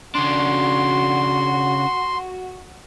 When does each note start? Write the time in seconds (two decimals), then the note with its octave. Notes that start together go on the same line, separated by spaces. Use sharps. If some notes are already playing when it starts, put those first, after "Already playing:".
0.15 C#3 D4 F#4 C6